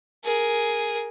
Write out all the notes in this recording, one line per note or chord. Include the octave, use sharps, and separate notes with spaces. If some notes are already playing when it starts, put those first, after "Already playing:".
G#4 A#4